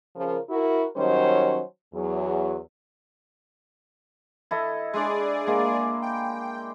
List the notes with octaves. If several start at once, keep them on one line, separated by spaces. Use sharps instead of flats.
C#3 F3 A#4
E4 F#4 A#4
D#3 F#3 G3 C#4 C5 D#5
E2 F#3
E4 A4 D#5
G#3 D4 G#4 D5
G#3 A#3
G5